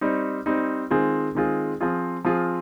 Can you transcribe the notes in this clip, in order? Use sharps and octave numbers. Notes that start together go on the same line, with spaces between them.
G3 C4 D#4
G3 C4 D#4
D#3 G#3 C4 F4 G#4
D#3 G#3 C4 F4 G#4
F3 C4 F4 G#4
F3 C4 F4 G#4